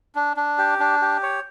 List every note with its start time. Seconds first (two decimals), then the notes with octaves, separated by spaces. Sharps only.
0.15 D4
0.37 D4
0.58 G4
0.80 D4
1.02 G4
1.23 C#5